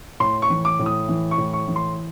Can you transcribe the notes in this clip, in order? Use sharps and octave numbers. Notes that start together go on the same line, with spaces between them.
A2 C6
C#6
E3
D6
A2
D#6
E3
C#6
A2
C#6
E3
C6